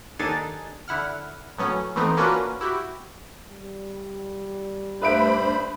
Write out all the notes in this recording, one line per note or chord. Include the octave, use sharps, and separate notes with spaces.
D#2 D4 D#4 A4 G#5 A6
D3 E4 F#5 F6
A2 F#3 B3 C#4
E3 A3 B3 C4 D#4
A#3 C#4 D4 F4 F#4 B4
E4 F#4 G4
G3
G2 A3 D4 B4 C5 E5 B5 D7